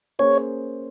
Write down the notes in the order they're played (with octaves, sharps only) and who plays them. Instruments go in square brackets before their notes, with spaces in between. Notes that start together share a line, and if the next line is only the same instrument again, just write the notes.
[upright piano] A#3 C#4 G#4 C5 [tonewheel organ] C#5